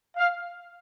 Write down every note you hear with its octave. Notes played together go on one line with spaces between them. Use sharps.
F5